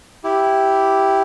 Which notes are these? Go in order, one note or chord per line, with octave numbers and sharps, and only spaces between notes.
E4 G4